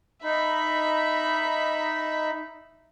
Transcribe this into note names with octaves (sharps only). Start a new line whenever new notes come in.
D#4 E5 B5